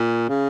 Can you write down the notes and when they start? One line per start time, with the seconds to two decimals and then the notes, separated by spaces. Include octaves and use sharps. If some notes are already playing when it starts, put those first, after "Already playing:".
Already playing: A#2
0.28 C#3